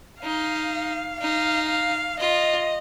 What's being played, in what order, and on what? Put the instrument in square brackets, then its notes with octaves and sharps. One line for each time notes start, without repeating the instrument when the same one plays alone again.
[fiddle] D#4 [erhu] F5
[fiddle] D#4 [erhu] F5
[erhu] F5
[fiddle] F4 [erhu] D#5